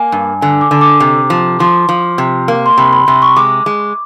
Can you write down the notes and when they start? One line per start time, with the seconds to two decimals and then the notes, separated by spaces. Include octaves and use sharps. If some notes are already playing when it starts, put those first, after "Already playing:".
Already playing: A#3 G#5
0.12 G2
0.41 D3 G#5
0.61 D6
0.71 D3
0.81 D6
1.00 C3
1.30 F3
1.60 F3 C6
1.89 F3
2.18 C3
2.48 A#3
2.66 C6
2.78 C3 B5
2.93 B5
3.07 C3 C6
3.22 C#6
3.36 G#3 D6
3.66 G#3